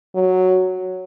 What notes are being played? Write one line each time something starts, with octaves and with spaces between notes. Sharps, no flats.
F#3